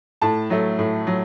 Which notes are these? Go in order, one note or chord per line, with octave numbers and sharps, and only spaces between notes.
A2 A5
F#3 A3
A2
F#3